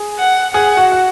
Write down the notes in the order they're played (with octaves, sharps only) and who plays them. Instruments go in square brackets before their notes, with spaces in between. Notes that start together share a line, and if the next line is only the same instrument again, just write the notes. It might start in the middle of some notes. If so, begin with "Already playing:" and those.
Already playing: [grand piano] G#4
[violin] F#5
[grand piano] G#4 [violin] F#5
[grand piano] F#4
F#4